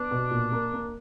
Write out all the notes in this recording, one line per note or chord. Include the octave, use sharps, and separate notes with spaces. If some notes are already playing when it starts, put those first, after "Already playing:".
Already playing: B3 D4
B2
A#2
A#3
A#3